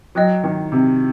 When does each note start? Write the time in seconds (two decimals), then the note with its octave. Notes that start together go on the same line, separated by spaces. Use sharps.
0.15 F#3 D#5 G5 D#6 F#6
0.44 D#3
0.72 C3